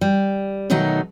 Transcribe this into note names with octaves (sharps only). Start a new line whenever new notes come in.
G3
B2 D#3 F#3 A3 D#4